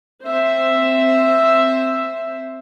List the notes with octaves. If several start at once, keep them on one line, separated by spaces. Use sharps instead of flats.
C4 C5 E5